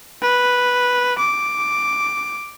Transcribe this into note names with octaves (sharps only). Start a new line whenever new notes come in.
B4
D6